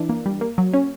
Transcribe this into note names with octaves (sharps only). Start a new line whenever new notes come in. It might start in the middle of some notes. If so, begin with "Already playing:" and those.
Already playing: E3 D4
A#3
G3
A#3
F#3
C#4